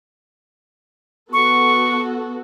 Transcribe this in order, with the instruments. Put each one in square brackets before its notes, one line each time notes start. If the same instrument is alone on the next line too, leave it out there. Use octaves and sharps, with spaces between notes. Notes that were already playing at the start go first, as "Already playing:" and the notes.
[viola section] B3 F#4 A4 [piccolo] C#6